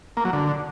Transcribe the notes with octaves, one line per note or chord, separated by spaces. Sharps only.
A#3
F#3
D3